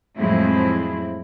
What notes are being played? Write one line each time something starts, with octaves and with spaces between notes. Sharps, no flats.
F2 A2 F#3 G#3 C4 E4